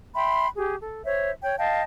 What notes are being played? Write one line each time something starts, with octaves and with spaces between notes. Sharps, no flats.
E5 G5 B5 C6
G4 G#4
A4
C5 C#5 E5
C#5 G5
D#5 F5 G5 A5